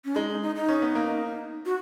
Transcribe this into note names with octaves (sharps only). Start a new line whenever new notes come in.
C#4
G#3 D#4
D#4
D#4
D#4
C#4
B3
A#3
F#4